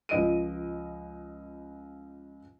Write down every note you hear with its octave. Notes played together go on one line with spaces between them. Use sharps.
C#2 F3 D#5 D7 D#7